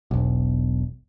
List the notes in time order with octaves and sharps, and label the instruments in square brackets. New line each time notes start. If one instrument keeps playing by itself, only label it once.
[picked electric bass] E1 B1